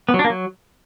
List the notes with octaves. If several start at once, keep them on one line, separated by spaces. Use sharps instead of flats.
B3
F#3
D4
A#3
F#3